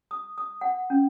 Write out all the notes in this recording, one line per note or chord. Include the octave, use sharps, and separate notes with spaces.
D#6
D#6
F#5
C#4